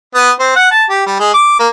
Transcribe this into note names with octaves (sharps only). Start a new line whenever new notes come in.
B3
C4
F#5
A5
G4
G3
G#3
D6
A#3